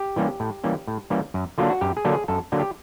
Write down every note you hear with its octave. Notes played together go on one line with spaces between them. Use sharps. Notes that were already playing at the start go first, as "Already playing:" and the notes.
Already playing: G4
E3 G3 A#3 C#4
A2
E3 G3 A#3 C#4
A2
E3 G3 A#3 C#4
F#2
D3 F#3 A#3 D4 F4
F#4
F#2 G4
G#4
D3 F#3 A#3 D4
G#4
F#2 A4
D3 F#3 A#3 D4
G4